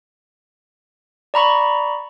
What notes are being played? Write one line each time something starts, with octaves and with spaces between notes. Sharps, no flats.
D5 A#5 B5 C#6